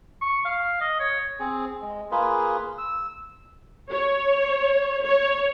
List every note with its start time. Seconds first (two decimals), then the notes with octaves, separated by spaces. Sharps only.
0.21 C#6
0.45 F5
0.81 D#5
0.99 C#5
1.39 C4 G#4
1.81 G#3
2.11 A#3 F4 G#4 B4
2.78 E6
3.90 C#5
5.02 C#5